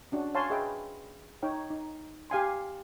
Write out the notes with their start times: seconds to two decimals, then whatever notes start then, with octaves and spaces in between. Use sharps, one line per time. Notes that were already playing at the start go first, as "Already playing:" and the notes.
0.12 C#4 D4 F#4
0.35 C#5 F5 G#5 A5 C6
0.50 G#4 B4 D#5 E5 G5
1.43 D#4 C#5 G5
1.70 D#4
2.30 G4 F5 G#5 C6